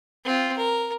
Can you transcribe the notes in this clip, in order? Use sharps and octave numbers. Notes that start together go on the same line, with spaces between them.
C4 F4
A#4